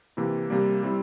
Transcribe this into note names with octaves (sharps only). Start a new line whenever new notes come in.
C3 E3 A#3 E4
C3 G3 A#3
G3 C4 E4